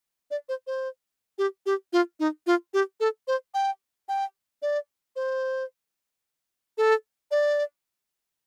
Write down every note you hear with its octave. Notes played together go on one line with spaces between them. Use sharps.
D5
C5
C5
G4
G4
F4
D#4
F4
G4
A4
C5
G5
G5
D5
C5
A4
D5